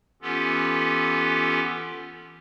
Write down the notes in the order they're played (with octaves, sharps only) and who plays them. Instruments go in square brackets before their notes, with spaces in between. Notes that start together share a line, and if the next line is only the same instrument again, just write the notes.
[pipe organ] E3 B3 C#4 F4 G4 A4